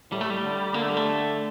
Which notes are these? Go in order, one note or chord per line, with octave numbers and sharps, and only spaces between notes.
A2 G3
A3
G3
D3
D3 A#3
A3
G3
A3